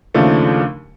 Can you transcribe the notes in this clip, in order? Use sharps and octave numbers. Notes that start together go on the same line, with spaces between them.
D#2 C#3 F3 A3 D4